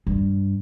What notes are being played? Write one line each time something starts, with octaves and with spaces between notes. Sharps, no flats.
G2